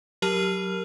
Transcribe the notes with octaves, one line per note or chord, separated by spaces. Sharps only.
F#3 G4 A#4 A5 F6